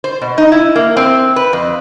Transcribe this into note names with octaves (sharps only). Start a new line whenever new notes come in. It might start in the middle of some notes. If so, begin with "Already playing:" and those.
C5
B2
D#4
E4
A#3
C4
B4
F2